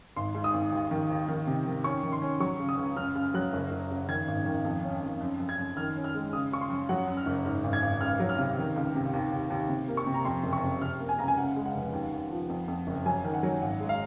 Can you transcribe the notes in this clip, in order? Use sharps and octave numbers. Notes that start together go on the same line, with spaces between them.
G#1 C6
G#2
D#6
G#1
D#2
D#3
D#2
D#3
C3
D#3
C#4 C#6
D#3
C6
C#4
F#3 C#6
C#3
D#6
C#2
F#2 F6
C#3 F6
F#3 F#6
F#1
F#1
C#3
D#3 G#6
G#1
D#3
F2
C#4
F2
F#2
F#2
G#6
F#2
D#3 F6
C#4
F6
G#3
C#3 D#6
C#3 C#6
C6
F#2
F#3 F#5
F#2
F6
F#1
G#2
G#1
G#6
G#1
C#2 F6
F#3
F6
C3
D#3
C#2
C3
D#2
D#2
D#2
C3
A#3
C#6
C3
A#5
F2 C6
F#1
C#6
C3
C3 F6
A#3
G#5
C#2 A#5
G#5
C#3 F#5
G#3
F#5
F1
D#2
D#2
F3
F2
F2
F#1
F#3 G#5
D#3
F#5
F#3
G#1 F#5
G#3
F5